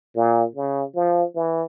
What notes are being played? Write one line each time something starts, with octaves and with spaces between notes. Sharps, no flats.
A#2
C#3
F3
E3